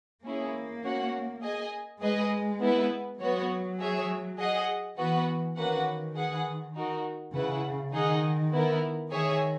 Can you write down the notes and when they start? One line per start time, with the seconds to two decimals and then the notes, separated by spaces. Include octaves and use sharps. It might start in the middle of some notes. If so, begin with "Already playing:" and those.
0.25 A#3 C#4 E4 G#4
0.83 C#4 F#4 C#5 F#5
1.43 G#4 D#5 G#5
2.01 G#3 G#4 B4 D#5
2.61 B3 E4 B4
3.20 F#3 B3 F#4 C#5
3.79 G#4 C#5 E5
4.38 G#4 D#5 F#5
4.97 E3 B3 F#4 B4 F#5
5.56 D#3 A#3 C#4 F#4 B4 F#5
6.16 G#4 B4 F#5
6.74 D#4 F#4 A#4
7.33 C#3 E4 B4 F#5
7.93 D#3 D#4 G#4 D#5 F#5
8.52 B3 E4 A#4
9.11 D#3 G#4 C#5 E5 G#5